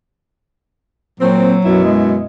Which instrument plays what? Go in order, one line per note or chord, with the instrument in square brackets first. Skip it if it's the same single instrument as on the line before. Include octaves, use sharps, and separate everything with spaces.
[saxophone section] A#2 C4 [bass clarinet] F#3
[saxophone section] F#2 B2 E4
[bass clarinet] G#3